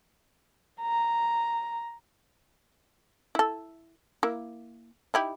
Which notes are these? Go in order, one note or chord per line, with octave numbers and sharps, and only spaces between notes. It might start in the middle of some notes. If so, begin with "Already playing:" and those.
A#5
E4 A4
A#3 E4
D#4 E4 G4